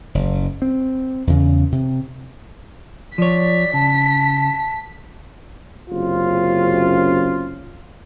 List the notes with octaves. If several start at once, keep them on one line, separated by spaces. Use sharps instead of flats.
F#1
C4
E2 C#3
C3
F3 C#5 D5 B6
C#3 A5
F#1 C3 C#4 F4